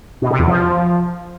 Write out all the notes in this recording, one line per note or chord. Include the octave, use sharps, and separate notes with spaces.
B2
C3
E2
F3